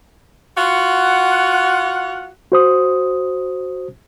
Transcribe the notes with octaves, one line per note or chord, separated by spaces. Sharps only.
F4 F#4 F#5
F#4 C5 D#6